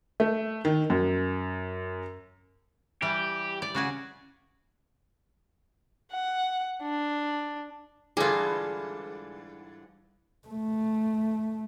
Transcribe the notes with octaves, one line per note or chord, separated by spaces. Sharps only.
A3
D#3
F#2
E3 G3 G4
D5
C#3 F#4 G#5
F#5
D4
G#2 D3 E3 G3 F4 G#4 A4
A3